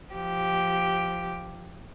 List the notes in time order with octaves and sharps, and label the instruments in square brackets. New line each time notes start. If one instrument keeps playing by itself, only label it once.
[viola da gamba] F3 G4